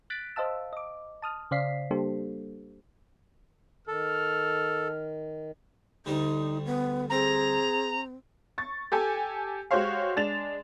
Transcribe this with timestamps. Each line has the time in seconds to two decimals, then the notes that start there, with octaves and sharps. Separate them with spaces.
0.10 F#6 A6 B6 D7
0.36 C5 D#5 F5 A5 E6
0.73 D#5 D6
1.22 A5 D#6 F6
1.51 C#3 C5 D5 F5 B6 C7
1.91 G3 A#3 D4 G4 A4 C5
3.88 D#3 A4 F6
6.06 D2 D3 G3 D#4
6.65 B3
7.10 C4 G#4 A#5
8.58 C#6 A6
8.92 G4 A4 G#5
9.71 G#3 F#4 G4 C5 C#5 F5
10.16 G#3 D4 A6 E7 F7